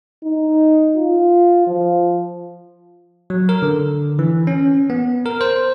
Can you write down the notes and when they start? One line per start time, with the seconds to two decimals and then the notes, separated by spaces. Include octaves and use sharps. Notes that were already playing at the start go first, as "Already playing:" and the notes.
0.24 D#4
0.96 F4
1.67 F3
3.30 F#3
3.49 A#4
3.62 D3
4.19 E3
4.47 C#4
4.90 B3
5.25 A#4
5.41 C5